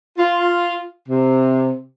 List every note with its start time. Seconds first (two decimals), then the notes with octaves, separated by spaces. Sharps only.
0.19 F4
1.09 C3